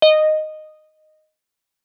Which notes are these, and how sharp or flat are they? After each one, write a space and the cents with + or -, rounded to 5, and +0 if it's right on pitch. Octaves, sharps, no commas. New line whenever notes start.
D#5 -10